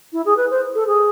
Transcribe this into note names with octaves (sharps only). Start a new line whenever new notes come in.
E4
G#4
B4
C5
A4
G#4